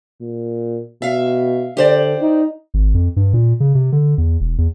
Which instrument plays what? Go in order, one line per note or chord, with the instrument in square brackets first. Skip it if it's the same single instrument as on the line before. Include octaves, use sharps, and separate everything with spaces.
[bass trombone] A#2
[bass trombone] B2 [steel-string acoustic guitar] E5 F5
[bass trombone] D3 [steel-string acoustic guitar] G4 C5 D5
[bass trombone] D#4
[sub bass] G#1
F2
G2
A#2
C#3
C3
D3
E2
E1
E2